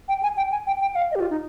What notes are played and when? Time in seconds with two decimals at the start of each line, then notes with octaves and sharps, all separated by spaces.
0.09 G5
0.23 G#5
0.37 G5
0.52 G#5
0.67 G5
0.81 G5
0.92 G5
0.95 F5
1.11 D#5
1.15 G4
1.20 F4
1.30 D#4